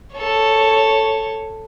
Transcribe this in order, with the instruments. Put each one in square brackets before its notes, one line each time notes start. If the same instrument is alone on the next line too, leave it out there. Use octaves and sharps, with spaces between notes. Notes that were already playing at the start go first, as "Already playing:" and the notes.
[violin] A4 C#5